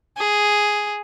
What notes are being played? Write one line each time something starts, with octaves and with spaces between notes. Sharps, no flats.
G#4